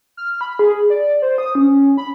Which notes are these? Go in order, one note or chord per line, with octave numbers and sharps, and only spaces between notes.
F6
B5
G#4
D5
C5
D#6
C#4
B5